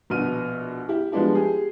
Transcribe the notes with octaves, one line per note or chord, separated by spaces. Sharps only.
A#1 B2 F#4 F6 D#7
E4 G4
F3 G3 G#3 B3 D4 E4
G4 G#4